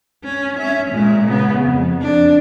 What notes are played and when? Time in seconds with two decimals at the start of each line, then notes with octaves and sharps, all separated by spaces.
0.25 C#4
0.59 C#4 E5
0.91 A#2 G#3
1.27 C#3 B3
1.64 F2
2.01 D4